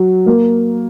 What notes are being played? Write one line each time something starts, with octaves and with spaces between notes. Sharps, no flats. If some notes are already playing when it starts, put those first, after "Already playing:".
Already playing: F#3
A#3